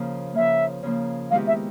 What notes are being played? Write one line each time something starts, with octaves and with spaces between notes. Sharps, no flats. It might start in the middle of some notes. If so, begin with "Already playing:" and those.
Already playing: C#3 F3 A#3
C#3 F3 A#3 E5
C#3 F3 A#3
D#3 G#3 B3 E4 G4 F5
E5